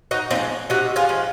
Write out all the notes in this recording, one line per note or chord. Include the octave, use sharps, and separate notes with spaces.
D#4 F#4
F3 G#3 C4 D#4
C3 D#4 F#4
F4 G#4
F3 G#3